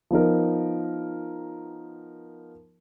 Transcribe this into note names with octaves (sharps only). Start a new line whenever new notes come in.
F3 B3 D#4 A#4